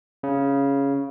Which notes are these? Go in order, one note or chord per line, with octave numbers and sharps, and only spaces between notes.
C#3